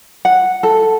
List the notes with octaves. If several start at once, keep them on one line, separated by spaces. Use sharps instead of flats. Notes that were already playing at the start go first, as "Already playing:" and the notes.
F#5
A4